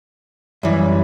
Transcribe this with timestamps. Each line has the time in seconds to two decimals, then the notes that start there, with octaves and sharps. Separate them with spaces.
0.63 F#2 E3 G3